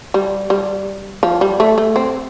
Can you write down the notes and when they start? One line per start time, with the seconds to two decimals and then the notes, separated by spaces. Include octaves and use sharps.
0.14 G3
0.50 G3
1.23 F3
1.41 G3
1.60 A3
1.78 A3
1.96 C4